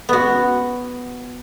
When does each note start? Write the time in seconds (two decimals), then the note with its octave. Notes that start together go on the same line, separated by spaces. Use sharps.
0.09 B3 F#4